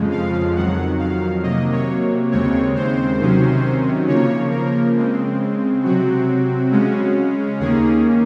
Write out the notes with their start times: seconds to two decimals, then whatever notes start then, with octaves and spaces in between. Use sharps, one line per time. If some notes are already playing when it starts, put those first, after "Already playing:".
Already playing: F2 C#3 F3 G#3
0.11 F5
0.55 F2 D#3 F#3 F#5
0.99 F5
1.43 C3 F#3 A#3 D#5
1.72 C#5
2.31 D#2 C#3 G#3 C4 C#5
2.75 C5
3.20 C3 D#3 F#3 C#4
4.08 C#3 F3 A#3 C#5
4.51 A#4
4.95 C#3 G#3 C4
5.84 C3 F#3 C4 F#4
6.72 C#3 G#3 C#4
7.60 D#2 D#3 A#3 C#4 G#4